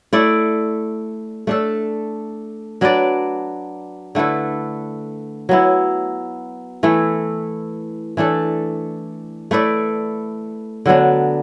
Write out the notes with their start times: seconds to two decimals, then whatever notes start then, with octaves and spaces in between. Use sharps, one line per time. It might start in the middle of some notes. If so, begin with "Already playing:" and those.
0.13 A3 E4 D5
1.47 A3 D4 A4
2.81 F#3 D4 B4 D5
4.15 D3 A3 E4 B4
5.49 F#3 B3 E4
6.83 E3 A3 E4 B4
8.17 E3 A3 D4 A4
9.51 A3 E4 B4 D5
10.86 D3 F#3 B3 D4